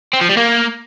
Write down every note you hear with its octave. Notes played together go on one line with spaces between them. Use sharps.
C4
F3
G3
A#3